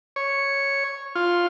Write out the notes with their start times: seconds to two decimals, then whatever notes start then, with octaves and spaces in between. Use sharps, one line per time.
0.16 C#5
1.15 F4